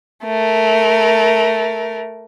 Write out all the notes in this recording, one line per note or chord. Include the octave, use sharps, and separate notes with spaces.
A3 A#4